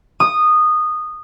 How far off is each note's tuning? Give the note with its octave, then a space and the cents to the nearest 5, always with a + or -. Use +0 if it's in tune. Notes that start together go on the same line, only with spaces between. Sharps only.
D#6 -15